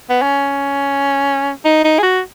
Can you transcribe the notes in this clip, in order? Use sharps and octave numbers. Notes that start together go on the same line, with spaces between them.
B3
C#4
D#4
D#4
G#4
F#4